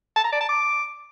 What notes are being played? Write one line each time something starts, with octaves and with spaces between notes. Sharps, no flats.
A5
A#5
D5
A5
D6